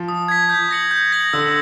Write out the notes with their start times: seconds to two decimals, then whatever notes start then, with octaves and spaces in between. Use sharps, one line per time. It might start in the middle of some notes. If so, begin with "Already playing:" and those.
Already playing: F3
0.08 D#6
0.28 G#6 B6
0.50 G6
0.71 A#6 C#7 F#7
0.91 G6
1.12 A#6 C#7 F#7
1.33 D3 E6